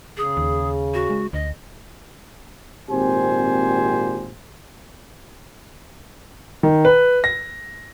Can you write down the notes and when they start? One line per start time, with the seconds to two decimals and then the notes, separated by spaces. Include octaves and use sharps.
0.17 C#3 G#4
0.37 D#2
0.94 F#4
1.10 G#3
1.33 D2 D#5
2.90 G#1 A#2 C4 G4 C5 G#5
6.63 D#3
6.85 B4
7.24 A#6